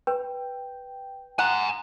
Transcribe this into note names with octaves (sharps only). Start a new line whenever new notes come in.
B4 G5
F#5 G#5 A#5